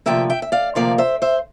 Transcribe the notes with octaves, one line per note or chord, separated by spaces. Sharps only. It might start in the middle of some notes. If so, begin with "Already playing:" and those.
D2 C3 F3 A#3 E5 G5
E5 G5
E5
D5 F5
D2 C3 F3 A#3 D5 F5
C5 E5
C5 E5